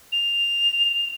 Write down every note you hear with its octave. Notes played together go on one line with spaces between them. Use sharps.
F7